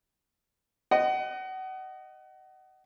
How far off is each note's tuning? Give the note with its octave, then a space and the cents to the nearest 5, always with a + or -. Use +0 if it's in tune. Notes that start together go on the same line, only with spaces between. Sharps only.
D#5 -10 F#5 +30